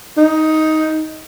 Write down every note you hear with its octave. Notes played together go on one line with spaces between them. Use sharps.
D#4